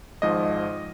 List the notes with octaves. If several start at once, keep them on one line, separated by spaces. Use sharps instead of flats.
G#1 G#2 F3 D#5